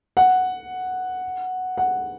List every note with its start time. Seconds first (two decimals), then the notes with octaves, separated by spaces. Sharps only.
0.17 F#5
1.78 F#5